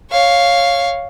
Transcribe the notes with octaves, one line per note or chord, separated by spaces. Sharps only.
C#5 F5